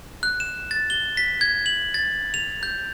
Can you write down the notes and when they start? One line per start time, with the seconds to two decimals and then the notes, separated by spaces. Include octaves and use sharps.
0.23 F#6
0.40 E7
0.71 A6
0.90 G7
1.17 B6
1.41 G#6
1.66 F#7
1.94 A6
2.34 F7
2.63 G6